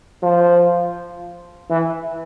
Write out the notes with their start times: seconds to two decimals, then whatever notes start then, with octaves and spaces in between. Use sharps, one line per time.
0.23 F3
1.70 E3